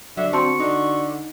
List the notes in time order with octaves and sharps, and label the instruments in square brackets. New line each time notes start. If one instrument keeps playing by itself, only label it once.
[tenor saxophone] D3 [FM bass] F#3 [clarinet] E5
[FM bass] C4 [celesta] F#4 A5 C6 [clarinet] C#6
[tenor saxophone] D3 [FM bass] D#4